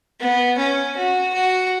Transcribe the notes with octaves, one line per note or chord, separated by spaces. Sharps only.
B3
C#4
F#4
F#4